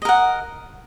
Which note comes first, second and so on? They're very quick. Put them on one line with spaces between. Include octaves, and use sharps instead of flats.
D#5 A#4 F#5